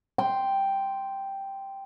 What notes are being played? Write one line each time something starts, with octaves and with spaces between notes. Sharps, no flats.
G5 C6